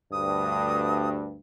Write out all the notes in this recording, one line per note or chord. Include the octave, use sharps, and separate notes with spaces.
D2 G2 D#6